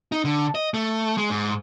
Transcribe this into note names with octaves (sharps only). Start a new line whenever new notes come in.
D#4
D3
D#5
A3
G#3
G#2